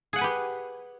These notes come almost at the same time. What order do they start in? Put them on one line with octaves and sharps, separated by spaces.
G#4 F#5 G#5 B4 G4